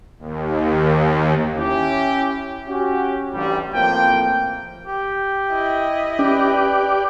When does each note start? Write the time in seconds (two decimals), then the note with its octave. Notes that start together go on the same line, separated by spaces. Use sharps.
0.19 D#2
1.57 C#4 E4 G4
2.68 C#4 F#4 G4
3.33 A1 G2 G3
3.74 A1 A2 F3 A#3 C4 G5
4.87 G4
5.50 E4 D#5
6.19 C#4 G4 B4 D5